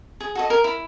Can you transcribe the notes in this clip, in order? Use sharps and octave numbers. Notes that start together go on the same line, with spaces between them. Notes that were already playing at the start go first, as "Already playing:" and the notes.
G#4
F#4 A4 D#5
A#4
E4